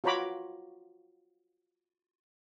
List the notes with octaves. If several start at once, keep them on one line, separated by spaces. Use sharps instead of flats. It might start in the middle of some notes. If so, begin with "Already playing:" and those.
F4 F#4 C#5 A#5 B5 D6